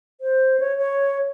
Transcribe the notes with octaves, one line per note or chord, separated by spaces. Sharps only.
C5
C#5
C#5